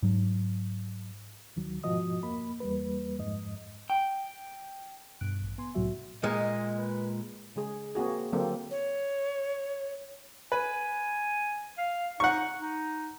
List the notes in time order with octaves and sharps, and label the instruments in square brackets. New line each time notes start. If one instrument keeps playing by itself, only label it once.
[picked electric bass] G#2 F#3
[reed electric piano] D2 D#3 F#3
G#2 B2 F3 F#4 D#5 D#6
F2 A#3 B5
E2 G3 A#3 B4
F2 G#2 D#5
[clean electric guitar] G5
[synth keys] G2 B2 F#6 D7
A1
B3 G#5 C6
C2 A2 C3 F#3 F#4 E5
[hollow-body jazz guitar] A#2 G#3 [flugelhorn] D#5
[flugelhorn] B4
[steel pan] C#3 G#3 G#4
A#3 C4 F#4 G#4
D3 F#3 A#3 C4 A4
[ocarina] C#5
[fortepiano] B4 [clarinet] G#5
[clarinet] F5
[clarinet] D#4 [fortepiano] F#5 C#6
[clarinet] D#4